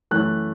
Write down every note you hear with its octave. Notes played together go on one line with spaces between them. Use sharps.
F#2 E3 A3 F#6